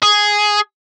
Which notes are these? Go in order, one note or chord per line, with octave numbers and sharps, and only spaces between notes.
G#4